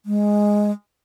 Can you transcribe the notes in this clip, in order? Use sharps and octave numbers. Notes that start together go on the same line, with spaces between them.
G#3